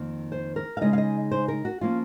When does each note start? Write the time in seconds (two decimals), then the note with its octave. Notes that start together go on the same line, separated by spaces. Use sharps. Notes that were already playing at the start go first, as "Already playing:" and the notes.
Already playing: F2 D#3 A#3
0.32 C5
0.56 A#4
0.77 F5
0.81 C#3 G#3 D#4 D#5
0.93 F5
0.98 D#5
1.32 C5
1.48 A#4
1.65 F#4
1.81 F3 A#3 C#4 F4